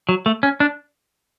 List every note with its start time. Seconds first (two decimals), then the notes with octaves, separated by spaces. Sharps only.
0.09 F#3
0.26 A3
0.43 C#4
0.60 D4